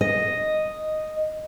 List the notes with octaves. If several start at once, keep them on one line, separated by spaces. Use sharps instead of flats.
D#5